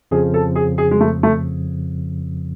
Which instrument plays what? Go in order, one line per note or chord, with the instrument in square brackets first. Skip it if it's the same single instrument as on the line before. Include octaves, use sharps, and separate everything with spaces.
[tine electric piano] F2 C#3 F3 [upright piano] G#4
[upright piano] A4
G#4
G#4
G#3
A3
A3